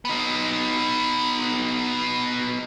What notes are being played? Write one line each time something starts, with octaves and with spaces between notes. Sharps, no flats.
B3 D#4